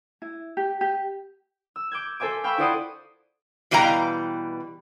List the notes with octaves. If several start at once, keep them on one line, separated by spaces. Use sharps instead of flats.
E4
G4
G4
E6
D6 G6 G#6
A4 C5 E5 G#5 D6
F5 G5 B5 C#6 E6
E4 F4 C5 D5 F#5 D#6
B2 E3 G3 F5 G5 A#5